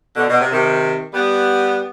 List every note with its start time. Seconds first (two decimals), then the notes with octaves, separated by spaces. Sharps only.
0.15 B2 D3
0.28 B2
0.40 C3
0.51 C3 D#3
1.13 G3 B3